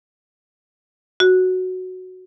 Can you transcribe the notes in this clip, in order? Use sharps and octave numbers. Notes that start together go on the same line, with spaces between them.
F#4